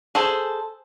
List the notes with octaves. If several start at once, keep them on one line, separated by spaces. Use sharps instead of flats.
G#4 A4 C5